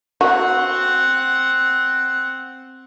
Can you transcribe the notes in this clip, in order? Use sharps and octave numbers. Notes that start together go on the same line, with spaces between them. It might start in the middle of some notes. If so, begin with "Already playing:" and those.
C4 F#4 F#5